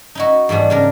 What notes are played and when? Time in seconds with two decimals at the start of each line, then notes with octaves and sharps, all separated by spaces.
0.15 D#4 E4 F#4
0.49 G#2 E3 G3 B3 D4
0.70 C#3 D4 A#4